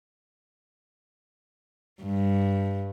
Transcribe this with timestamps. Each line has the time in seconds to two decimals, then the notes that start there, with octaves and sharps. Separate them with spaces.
2.03 G2